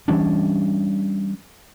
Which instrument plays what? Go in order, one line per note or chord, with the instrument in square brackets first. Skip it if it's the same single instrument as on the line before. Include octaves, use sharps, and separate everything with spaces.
[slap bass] E3 G3 C#4 D4